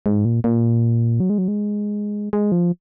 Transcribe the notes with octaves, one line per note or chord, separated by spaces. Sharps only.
G#2
A#2
A#2
F#3
G#3
F#3
G#3
G#3
F3